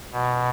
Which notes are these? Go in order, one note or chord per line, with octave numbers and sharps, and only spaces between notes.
B2